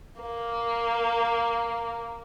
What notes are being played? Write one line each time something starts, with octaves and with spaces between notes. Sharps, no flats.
A#3